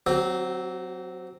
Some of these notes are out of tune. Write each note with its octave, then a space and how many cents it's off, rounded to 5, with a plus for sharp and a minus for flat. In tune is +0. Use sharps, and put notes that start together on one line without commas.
F#3 +0 C4 +0 G4 -45